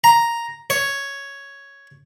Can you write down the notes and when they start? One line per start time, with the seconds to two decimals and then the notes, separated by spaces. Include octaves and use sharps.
0.04 A#5
0.70 C#5